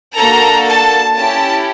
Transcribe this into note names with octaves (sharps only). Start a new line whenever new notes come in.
A#3 D4 F#4 A4 A#5
A5
C#4 E4 G4 A5